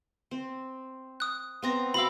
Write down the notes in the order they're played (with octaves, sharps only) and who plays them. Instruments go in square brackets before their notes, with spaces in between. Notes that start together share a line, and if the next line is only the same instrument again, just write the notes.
[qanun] C4
[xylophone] D#6 F#6
[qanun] B3 C4 A#5
[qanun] F#4 F5 D6 [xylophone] B5 E6